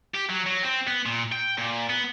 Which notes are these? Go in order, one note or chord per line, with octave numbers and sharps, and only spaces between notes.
G4
F#3
F#3
C4
B3
A#2
G5
A#2
B3